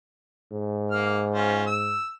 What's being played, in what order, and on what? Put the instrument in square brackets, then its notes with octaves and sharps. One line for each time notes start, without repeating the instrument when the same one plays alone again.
[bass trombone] G#2
[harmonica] A#3 F6
C#4 F4 C5
E6